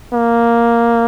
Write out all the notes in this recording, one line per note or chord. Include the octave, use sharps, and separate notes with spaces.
A#3